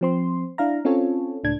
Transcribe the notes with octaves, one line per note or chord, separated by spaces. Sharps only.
F3 C4 C6
D4 E4 F5 A#5
C4 C#4 F4 A4 C#5
C#2 A2 D4 G#6